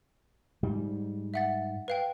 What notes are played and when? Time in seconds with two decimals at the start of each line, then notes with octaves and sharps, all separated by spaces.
0.63 G#2 G3
1.34 E5 F#5 A6
1.88 B4 F5 G5